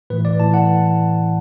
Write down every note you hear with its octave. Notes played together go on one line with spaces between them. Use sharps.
A2 E3 B4
D5
A2 E3 A5
F#5